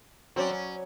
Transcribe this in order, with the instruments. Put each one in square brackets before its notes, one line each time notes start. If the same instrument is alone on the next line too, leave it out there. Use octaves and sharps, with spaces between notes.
[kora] F#3 B4 D5 [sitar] C4 C#4
[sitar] C#4